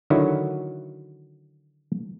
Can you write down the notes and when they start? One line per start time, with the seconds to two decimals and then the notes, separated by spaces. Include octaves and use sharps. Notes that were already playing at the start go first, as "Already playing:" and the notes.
0.10 D3 D#3 F#3 E4 F#4